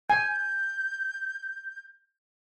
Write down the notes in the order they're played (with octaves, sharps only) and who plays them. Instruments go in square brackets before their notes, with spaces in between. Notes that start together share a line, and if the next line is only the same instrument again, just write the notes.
[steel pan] G#5 [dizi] G6